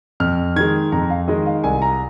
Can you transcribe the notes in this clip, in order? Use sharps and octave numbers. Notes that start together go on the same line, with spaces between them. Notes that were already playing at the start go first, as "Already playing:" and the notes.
F2 F6
D#3 G#3 G#6
F2 A#5
F5
D#3 G#3 D#5
F5
C2 G#5
A#5